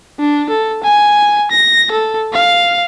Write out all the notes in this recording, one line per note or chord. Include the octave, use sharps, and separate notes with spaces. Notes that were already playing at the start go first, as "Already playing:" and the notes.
D4
A4
G#5
A#6
A4
F5